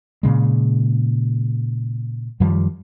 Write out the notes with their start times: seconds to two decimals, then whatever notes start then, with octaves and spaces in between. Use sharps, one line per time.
0.23 A#2 C#3 G#3
2.40 F#2 D#3 F3 G3